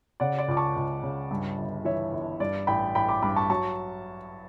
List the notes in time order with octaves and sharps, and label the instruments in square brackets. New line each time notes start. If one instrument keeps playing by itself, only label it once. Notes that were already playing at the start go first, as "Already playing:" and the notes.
[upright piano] C#3 D5 F#5
D5
C#2 D6
A5 C#6
C#2
C#3
G2
G1
E3 C#5 E5
G1
G2 D5
A1 G5 B5
A1 G5 B5
B5 D6
G2 B5 D6
A5 C#6
F#3 A5 C#6